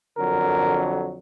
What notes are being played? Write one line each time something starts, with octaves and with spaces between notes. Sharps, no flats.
F2 D3 F#3 A#4